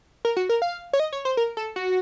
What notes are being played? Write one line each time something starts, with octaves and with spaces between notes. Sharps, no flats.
A#4
F#4
A#4
F5
C#5
D#5
C#5
C5
A#4
A4
F#4